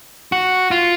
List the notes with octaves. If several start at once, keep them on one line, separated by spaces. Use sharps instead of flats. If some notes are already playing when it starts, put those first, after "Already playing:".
F#4
F4